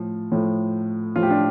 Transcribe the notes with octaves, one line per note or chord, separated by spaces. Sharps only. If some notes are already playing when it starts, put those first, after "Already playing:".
Already playing: A2 F3
A2 F3
A2 F3 F4
G4
D4 F4